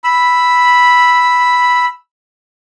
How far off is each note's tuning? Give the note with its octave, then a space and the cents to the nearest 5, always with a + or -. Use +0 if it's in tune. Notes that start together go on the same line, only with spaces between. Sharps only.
B5 +0 E6 +0